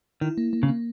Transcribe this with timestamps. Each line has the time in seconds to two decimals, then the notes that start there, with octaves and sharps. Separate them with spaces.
0.21 D#3 E4
0.38 A#3
0.53 A#3
0.63 C#3
0.68 A#3